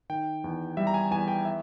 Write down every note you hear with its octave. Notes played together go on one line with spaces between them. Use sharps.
D#3 G5
E2
G3 E5
A#5
G#5
E2 G#5
G5
E5